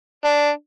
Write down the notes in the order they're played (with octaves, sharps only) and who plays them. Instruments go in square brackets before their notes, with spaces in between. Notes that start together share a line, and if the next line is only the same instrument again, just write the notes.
[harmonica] D4